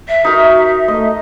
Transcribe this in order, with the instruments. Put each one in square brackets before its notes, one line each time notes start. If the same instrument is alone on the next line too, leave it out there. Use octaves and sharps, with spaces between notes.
[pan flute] E5
[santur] D#4 A#4 [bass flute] F#4
[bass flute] A3 [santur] D#5